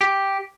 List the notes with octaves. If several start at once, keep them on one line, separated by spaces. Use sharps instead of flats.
G4